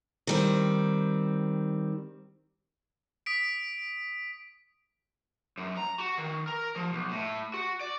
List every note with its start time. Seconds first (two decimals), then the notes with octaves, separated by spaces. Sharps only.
0.27 D#3 G3 C4
3.26 D#6 B6 D7
5.58 F#2
5.77 A#5
6.00 F#4
6.18 D#3
6.47 A#4
6.76 F3
6.93 B1
7.11 A2
7.54 F#4
7.81 D5